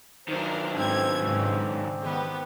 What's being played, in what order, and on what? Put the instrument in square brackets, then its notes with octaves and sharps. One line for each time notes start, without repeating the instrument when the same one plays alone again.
[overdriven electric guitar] D#3 F#3 [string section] D4 A#4 C5
[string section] G#2 G#6 [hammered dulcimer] C4 D4
[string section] G#2 C#3
D#3 B3 G4